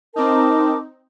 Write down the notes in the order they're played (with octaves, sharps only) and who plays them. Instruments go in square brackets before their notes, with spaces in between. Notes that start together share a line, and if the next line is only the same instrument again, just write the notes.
[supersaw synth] C4 D#4 [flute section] A#4 A5 D6